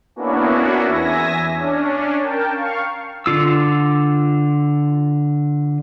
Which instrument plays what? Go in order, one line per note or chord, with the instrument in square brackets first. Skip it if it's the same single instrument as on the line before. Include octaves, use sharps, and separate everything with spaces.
[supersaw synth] A#3 B3 C#4 D4 E4 F#4
E2 E5 G#5 A#6
C#4 D4
A#4 G5 A5
F5 C#6
[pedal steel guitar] D3 F4 E6